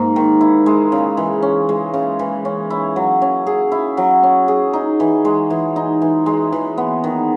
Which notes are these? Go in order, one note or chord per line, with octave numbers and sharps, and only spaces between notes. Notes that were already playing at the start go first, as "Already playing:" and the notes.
Already playing: G#2 A#3
D#3
E4
G#3
C#3
E3
C#4
G#3
C#3
E3
C#4
E4
F#3
C#4
G#4
E4
F#3
C#4
G#4
D#4
E3
G#3
E3
D#4
E3
G#3
E3
B3
D#3